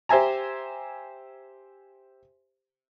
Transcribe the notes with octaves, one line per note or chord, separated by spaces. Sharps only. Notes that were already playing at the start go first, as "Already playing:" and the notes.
G4 C5 E5 G#5 A#5